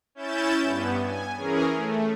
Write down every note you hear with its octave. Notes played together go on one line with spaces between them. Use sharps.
C#4 E4 G6 A6 E7
G2 B3
G#5
E3 C#4 G#4 A#4
A3